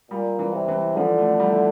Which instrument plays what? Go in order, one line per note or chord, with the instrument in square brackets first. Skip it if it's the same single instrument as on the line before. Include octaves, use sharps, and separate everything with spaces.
[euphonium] A#2 [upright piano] G3
[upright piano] E3
[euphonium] C3
[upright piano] E3
[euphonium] D3 [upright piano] F3
[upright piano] A3
G3
E4